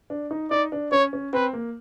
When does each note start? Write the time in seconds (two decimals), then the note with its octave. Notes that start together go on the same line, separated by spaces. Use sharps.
0.10 D4
0.31 D#4
0.51 D#4 D5
0.72 D4
0.92 C#4 C#5
1.13 C#4
1.33 C4 B4
1.53 A#3